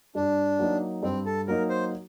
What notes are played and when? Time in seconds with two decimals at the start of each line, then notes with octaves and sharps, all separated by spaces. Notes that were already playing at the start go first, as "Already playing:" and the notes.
0.15 G2 D4
0.59 F#3 A#3 D#4
1.03 G2 C4
1.26 A4
1.47 F#3 A#3 D#4 A#4
1.69 C5